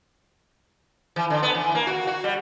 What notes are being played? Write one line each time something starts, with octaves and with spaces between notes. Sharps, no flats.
E3
D3
B3
E3
A#3
F#4
F#4
G3